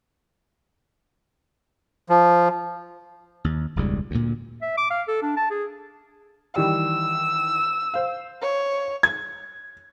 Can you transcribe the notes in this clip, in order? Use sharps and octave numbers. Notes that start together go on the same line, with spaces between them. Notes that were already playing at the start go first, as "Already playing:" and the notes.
F3
D#2
E1 C#2 G#2 G3
D2 A#2
E5
D6
F5
A4
D4
A5
G#4
D#3 E3 G3 E6
C5 F5
C#5
G#6